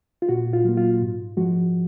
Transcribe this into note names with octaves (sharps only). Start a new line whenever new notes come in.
F4
A#2 F#4
F4
F#3 A#3
F4
G#2
F3 G#3 F#4